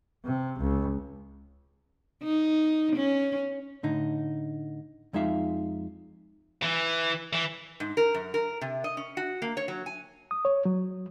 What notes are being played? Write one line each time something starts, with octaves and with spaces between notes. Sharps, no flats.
C3
C#2
D#4
C#4
A2 D3 D#4
F2 G#3 D#4 E5 F5
E3
E3
G#2
A#4
F#2
A#4
C3
D#5
C#4
F#4
A#3
C#5
F#3
G#5
D#6
C#5
F#3